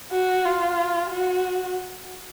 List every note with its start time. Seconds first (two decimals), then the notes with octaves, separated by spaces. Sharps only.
0.11 F#4
0.44 F4
1.10 F#4